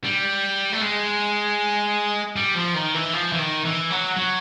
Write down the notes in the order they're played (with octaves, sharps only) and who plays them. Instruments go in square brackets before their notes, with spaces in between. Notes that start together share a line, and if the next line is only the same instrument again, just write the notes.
[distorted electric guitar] G3
A3
G#3
G3
F3
D#3
E3
F3
E3
D#3
E3
F#3
F#3